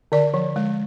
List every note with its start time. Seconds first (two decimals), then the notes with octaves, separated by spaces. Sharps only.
0.12 D3 D5
0.34 F3
0.56 G#3